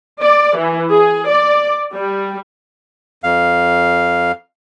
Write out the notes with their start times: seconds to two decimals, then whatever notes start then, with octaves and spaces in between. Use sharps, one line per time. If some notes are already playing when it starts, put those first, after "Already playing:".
0.22 D5
0.57 E3
0.91 G#4
1.28 D5
1.94 G3
3.24 F2 F5